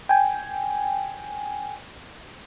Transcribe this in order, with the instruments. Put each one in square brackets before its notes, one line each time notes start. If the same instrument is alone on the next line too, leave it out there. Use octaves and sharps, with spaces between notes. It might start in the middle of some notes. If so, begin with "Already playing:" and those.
[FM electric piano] G5 G#5